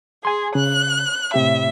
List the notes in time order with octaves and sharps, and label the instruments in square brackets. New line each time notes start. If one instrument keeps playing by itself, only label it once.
[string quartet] G#4 [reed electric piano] G#5 C6
[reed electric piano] C#3 [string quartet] F#6
[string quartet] A2 E5 [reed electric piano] C3 G4